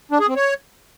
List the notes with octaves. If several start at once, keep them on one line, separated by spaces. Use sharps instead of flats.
D4
G#4
C4
C#5